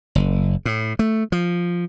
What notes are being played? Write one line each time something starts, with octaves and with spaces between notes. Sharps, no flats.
F#1
A2
A3
F3